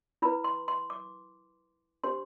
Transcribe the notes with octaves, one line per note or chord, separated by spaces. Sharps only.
E4 B4 B5
C6
C6
D6
D4 G4 C5 C6